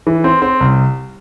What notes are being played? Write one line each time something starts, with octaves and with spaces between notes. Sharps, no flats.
E3
C4
C4
C2